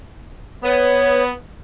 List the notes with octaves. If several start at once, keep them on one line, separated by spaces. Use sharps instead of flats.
B3 C#5